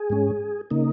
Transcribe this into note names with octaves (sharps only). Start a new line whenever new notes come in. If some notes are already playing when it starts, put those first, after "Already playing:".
Already playing: G#4
G#2 G#3 C#4
C#3 A#3 D#4